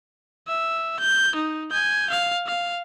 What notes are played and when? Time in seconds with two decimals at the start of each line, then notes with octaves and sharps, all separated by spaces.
0.48 E5
1.00 G6
1.36 D#4
1.71 G#5 G6
2.10 F5
2.47 F5